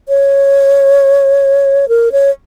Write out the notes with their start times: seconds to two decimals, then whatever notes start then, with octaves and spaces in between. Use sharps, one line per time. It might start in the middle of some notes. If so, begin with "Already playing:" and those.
0.09 C#5
1.89 A#4
2.12 C#5